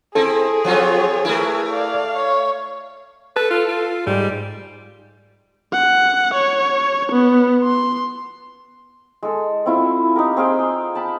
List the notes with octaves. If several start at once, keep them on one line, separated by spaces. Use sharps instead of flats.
C4 E4 G#4 A4
F3 F#3 C4 F4 C#5
A3 E4 A#4 B4
D5 F5
C#5
A4 B4
F4
F4
G#2 G3
F#5
C#5
B3
C6
G#3 A4
C4 E4 F4
D#4 G4 A#4
C4 G#4 F5 G5
C6
A5 B5